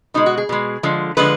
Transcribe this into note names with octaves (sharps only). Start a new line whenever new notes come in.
B2 G#3 D#4
F#4
G#4
B2 G#3
D3 F3 G#3
D3 F3 G#3 B4